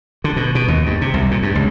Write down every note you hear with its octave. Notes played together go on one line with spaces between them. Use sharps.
D3
B2
B2
D#2
G2
C3
C2
A#2
G2
C#2